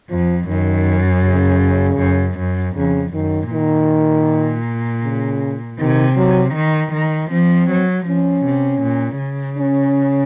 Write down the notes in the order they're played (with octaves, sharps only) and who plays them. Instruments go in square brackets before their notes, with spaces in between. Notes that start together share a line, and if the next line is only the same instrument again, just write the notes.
[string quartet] F2 [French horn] F3
[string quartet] F#2 [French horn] D#3
[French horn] C#3
[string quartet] F#2
F#2
[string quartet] F2 [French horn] C#3
[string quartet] F#2 [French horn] D#3
[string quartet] A#2 [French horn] D#3
[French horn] C#3
[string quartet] C3 [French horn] D#3
[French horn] F#3
[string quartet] D#3
D#3
[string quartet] F3 [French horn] C4
[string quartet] F#3
[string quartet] F3 [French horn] C#4
[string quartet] C3
A#2
C#3
[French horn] C#4